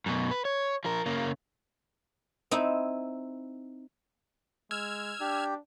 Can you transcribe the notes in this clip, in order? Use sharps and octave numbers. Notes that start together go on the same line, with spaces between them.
F#2 B2
B4
C#5
F3 A#4
C#3 A#3
C4 D#4 E4
G#3 E6 F6 G#6
D4 G4